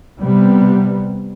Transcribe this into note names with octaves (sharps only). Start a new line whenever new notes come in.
C3 G3 B3